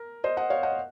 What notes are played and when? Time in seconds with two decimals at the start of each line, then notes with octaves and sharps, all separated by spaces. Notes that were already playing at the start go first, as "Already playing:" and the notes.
Already playing: A#4
0.24 C5 D#5
0.37 D#5 F#5
0.50 C#5 F5
0.63 D#5 F#5